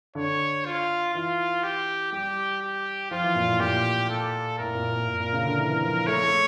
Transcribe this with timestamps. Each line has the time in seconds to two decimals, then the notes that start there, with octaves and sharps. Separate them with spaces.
0.15 D3 C#5
0.66 F4
1.14 E3 F4
1.64 G4
2.12 G3 G4
2.62 G4
3.11 F3 F4
3.24 E3
3.36 A#2
3.48 A2
3.60 A#2 G4
4.10 A4
4.59 A2 A#4
4.75 A#2
4.92 A#2
5.08 A#2
5.20 A#2
5.33 C#3
5.45 D3
5.58 E3
5.70 E3
5.82 F3
6.07 A3 C#5
6.23 A3